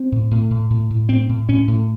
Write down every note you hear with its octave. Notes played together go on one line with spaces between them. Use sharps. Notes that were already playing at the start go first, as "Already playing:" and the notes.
Already playing: C4
A2
A2
A2
A2
A2
A2 C4
A2
A2 C#4
A2